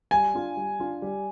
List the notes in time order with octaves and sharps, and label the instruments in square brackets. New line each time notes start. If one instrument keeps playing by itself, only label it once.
[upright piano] G3 [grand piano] G#5
[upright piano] D4 F4
G3
D4 F4
G3